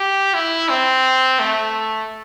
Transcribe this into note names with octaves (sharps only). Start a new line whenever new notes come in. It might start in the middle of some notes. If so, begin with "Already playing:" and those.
Already playing: G4
E4
C4
A3